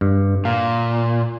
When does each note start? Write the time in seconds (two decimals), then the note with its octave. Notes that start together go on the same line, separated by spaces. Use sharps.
0.01 G2
0.45 A#2 F5